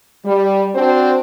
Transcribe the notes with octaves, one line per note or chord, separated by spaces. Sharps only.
G3
C4 D4 F#4 C5